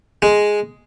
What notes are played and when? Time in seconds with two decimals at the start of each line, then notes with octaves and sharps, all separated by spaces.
0.22 G#3